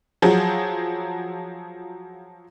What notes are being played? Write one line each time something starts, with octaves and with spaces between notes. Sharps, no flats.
F3 F#3 G#4